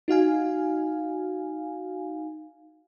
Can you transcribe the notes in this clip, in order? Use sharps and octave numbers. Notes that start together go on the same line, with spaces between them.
D#4 F#4 F5 G#5